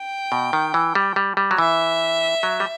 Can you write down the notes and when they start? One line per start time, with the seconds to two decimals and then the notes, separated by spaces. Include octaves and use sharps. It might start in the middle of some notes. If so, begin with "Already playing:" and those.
Already playing: G5
0.32 B2
0.53 D#3
0.74 E3
0.95 G3
1.16 G3
1.37 G3
1.51 F#3
1.58 E3 E5
2.43 F#3
2.60 G3